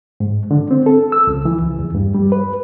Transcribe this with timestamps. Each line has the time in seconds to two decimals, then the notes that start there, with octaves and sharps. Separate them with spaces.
0.20 G#2
0.51 D3
0.71 C4
0.86 A4
1.12 E6
1.27 C#2
1.45 E3
1.63 C#2
1.79 E2
1.95 G2
2.15 G3
2.32 B4